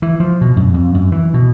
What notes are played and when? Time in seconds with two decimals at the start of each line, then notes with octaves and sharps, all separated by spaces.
0.02 E3
0.20 F3
0.41 B2
0.56 F#2
0.74 F2
0.94 F#2
1.12 E3
1.34 B2